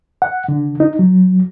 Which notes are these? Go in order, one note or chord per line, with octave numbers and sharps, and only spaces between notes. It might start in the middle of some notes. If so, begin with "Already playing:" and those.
F#5
D3
D#4
F#3